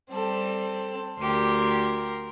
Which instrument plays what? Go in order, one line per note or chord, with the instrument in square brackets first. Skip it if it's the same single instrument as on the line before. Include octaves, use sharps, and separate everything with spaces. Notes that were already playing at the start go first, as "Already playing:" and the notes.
[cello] G3 [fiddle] C4 A4
[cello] D2 G4 [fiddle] A#4 C6